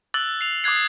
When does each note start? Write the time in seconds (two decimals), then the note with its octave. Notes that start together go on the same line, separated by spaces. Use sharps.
0.14 D6 E6 F#6 A6 F#7
0.41 C7 F7
0.64 D6 D#6 F#6 G#6 C7